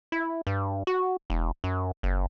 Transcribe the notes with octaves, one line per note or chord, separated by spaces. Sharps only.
E4
G2
F#4
E1
F#2
F#1